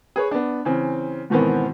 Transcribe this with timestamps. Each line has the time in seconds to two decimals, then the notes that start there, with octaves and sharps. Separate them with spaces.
0.16 G#4 B4 C#5
0.31 B3 D4
0.65 C#3 E3 C4
1.30 G#2 B2 D#3 E3 B3 C4